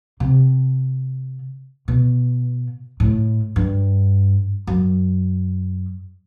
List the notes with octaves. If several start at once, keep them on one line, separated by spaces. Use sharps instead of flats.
C3
B2
A2
G2
F#2